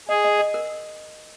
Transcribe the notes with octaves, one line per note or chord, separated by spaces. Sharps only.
G#4 D#5
D#5
D#5
A#4